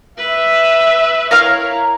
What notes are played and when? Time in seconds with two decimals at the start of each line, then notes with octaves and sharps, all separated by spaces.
0.18 B4 E5
1.31 E4 A#4 C#5 F5 F6